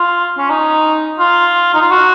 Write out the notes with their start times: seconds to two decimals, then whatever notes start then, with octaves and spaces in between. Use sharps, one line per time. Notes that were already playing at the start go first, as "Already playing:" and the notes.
Already playing: F4
0.38 C#4
0.50 D#4
1.20 F4
1.74 D#4
1.81 F4
1.91 F#4